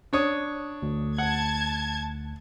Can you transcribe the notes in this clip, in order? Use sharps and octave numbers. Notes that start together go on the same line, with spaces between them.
D4 C#5 D#6
D2
F#5 A5 G#6